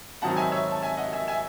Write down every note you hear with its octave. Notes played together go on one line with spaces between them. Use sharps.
G#2 D#3 F#3 C4 D#4 F#5 A5
E5 G#5
C#5 E5
A5
E5 G#5
D#5 F#5
E5 G#5
E5 G#5